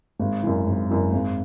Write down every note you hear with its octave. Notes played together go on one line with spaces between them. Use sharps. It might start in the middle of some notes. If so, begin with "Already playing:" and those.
G#1
F#2 E3
G#1
F#2 E3
G#1